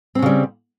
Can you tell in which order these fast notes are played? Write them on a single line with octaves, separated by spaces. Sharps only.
C4 C#4 C#3 G3